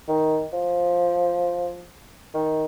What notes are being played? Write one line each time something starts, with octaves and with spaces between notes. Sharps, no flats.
D#3
F3
D#3